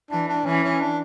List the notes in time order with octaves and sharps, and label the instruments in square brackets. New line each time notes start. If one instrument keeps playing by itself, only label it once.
[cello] E3 [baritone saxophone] D4
[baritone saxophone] D4
[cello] E3 [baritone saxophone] C#4
[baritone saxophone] C#4
D4